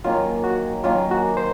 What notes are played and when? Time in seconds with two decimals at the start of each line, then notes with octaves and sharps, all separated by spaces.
0.04 D#3 F#3 A#3 C#4 F4
0.44 F#4
0.84 D#3 F#3 A#3 C#4 F4
1.11 F#4
1.37 C5